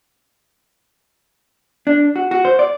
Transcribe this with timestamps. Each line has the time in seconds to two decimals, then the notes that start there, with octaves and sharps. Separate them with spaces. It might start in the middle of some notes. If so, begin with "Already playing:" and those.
1.87 D4
2.16 F#4
2.31 F#4
2.45 C5
2.59 D5